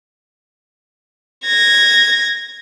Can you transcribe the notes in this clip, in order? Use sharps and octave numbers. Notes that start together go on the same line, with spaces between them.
G#6 A#6